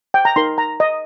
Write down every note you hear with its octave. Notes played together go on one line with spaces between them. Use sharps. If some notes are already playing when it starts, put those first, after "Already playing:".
G5
A#5
D#4 A#4 C6
A#5
D#5